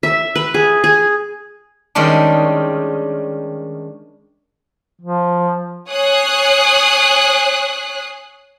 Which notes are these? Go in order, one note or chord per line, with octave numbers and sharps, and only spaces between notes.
E5
B4
G#4
G#4
D#3 G3 G#3 C#4 D4
F3
C#5 G#5 D#6 F#6 C7